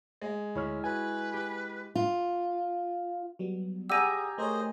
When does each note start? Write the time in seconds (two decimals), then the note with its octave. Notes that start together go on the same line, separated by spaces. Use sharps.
0.22 G#3
0.55 D2 E4 C#5 F6
0.84 F#4 B4 G#5
1.34 G4
1.95 F4
3.39 F#3 G3 B3
3.90 G4 G#4 D5 F#5 G#5 A#5 E6 D#7
4.38 A3 G#4 A#4 C5 C#5 D#5